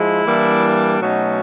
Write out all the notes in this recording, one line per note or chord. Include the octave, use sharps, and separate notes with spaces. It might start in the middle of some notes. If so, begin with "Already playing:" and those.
Already playing: F3 G#3 E4
E3 G3 A#3 D4
B2 F#3 A3 C#4 D#4